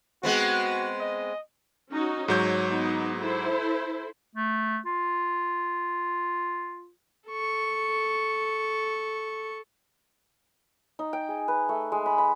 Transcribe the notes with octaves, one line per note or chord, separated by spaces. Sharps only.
G#3 B3 C4 F#4
D#5
C#4 D#4 F#4
G#2 F#3 C#5 G6
B3 D#4
E4 A4 C5
A3
F4
A4 C#6
D#4
G5
G#4
B4
A3
G#3
B5
B5